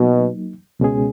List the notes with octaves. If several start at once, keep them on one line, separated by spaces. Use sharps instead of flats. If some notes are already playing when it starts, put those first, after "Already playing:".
Already playing: B2 F#3 A#3 D#4
C#2 B2 G#3 C#4 G#4